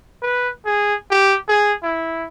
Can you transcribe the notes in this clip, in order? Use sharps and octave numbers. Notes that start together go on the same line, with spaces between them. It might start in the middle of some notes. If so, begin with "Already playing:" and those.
B4
G#4
G4
G#4
E4